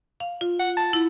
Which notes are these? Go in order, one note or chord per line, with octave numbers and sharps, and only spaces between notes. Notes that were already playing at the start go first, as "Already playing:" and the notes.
F5
F4
F#5
A5
E4